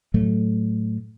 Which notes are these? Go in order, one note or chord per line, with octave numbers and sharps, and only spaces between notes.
A2 F#3 A3